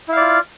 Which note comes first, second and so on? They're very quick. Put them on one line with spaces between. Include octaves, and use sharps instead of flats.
E4 F5 D5 F4